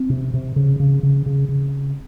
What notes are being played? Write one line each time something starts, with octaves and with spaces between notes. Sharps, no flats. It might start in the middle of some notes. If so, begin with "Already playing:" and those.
Already playing: C4
C3
C3
C#3
C#3
C#3
C#3
C#3